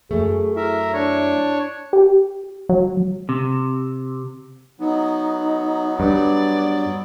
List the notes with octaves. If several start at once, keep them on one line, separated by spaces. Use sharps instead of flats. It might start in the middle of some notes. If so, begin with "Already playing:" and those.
F#2 A3 G#4
E4 A#4 E5
D4 C#5
G4
F#3
C3
F#3 B3 D#4
G2 B4 D5